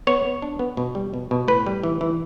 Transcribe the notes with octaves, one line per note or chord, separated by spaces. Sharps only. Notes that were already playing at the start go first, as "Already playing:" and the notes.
B3 C#5
B3
D4
B3
B2
G3
B2
B2
A2 B4
G3
E3
E3